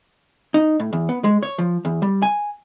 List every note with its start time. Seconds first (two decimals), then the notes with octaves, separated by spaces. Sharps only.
0.54 D#4
0.80 A2
0.93 E2
1.09 B3
1.24 G#3
1.43 C#5
1.58 F3
1.85 E2
2.02 G3
2.22 G#5